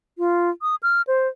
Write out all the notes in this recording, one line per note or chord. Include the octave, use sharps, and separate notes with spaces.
F4
D#6
F6
C5